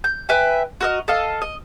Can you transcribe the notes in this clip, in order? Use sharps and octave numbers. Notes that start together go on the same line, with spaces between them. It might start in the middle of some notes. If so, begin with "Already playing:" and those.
G6
B4 E5 G5 G#5
F#4 A#4 D#5
A4 D#5 F5
D#5